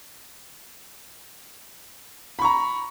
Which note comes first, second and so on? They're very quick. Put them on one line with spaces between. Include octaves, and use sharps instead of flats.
B5 C#6 A#5